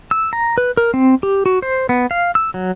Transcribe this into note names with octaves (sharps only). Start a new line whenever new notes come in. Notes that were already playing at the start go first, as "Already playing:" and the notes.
E6
A#5
B4
A#4
C4
G4
F#4
C5
B3
F5
E6
F#3